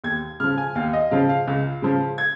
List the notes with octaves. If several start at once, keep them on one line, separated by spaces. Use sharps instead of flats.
D#2 G#6
C#3 F3 F6
G#5
D#2 F5
D#5
C#3 F3 F5
F5
C#2
C#3 F3
G#6